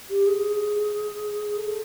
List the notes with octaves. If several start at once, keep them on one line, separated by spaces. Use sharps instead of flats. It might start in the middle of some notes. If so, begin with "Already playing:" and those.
G4
G#4
A4